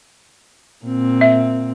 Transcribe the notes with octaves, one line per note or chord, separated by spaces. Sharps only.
A#2 C4
E5